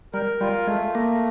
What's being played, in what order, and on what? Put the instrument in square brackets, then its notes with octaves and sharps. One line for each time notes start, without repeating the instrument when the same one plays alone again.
[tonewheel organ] G3 [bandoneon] A#4
[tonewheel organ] G3 [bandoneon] F4
[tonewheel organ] G#3 [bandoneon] A3
[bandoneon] A3 [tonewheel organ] A#3